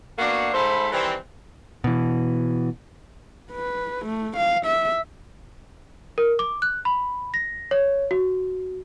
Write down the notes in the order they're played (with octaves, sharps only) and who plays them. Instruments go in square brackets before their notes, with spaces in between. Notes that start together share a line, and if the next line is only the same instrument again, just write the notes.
[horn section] A#3 B3 D4 F#4
G#2 A4 C5 E5 B5
D#3 E3 G3 C4
[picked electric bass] B2 E3
[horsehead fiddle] B4
A3
F5
E5
[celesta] A#4
D6
F#6
B5
A#6
C#5
F#4